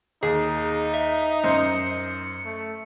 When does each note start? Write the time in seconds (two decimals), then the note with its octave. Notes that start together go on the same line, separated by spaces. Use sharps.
0.23 D#2 D#4 G#4
0.94 E5
1.44 F#2 C5 D#5 C#7
2.45 A3